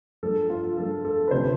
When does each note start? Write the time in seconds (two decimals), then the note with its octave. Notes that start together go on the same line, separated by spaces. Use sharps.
0.23 G2 F3 A3 A4
0.50 F4
0.77 G2 F3 A3 A4
1.05 A4
1.28 B4
1.31 D2 C3 F3 A3 C5